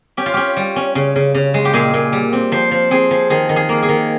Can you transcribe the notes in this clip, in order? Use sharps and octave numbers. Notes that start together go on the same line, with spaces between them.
C#4 G4
F4
C#4 G4
G3
C#4
C#3
C#3
C#3
G#3
G4
A#2 G#4
A#2
G3
C4
F3 C5
F3
C4 G#4
F3
D#3 G#4
D#3
G#4
A#3
G#4
D#3